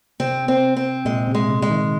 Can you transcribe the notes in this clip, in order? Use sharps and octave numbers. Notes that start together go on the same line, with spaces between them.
C3 C4
C4
C4
A#2 G#3
C3
G#3
C3
G#3
D#3